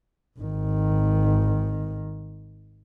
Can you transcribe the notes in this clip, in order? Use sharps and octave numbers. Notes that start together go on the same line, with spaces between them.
G#1 D#3